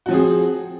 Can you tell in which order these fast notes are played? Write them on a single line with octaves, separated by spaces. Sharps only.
F#4 F3 C4 G#4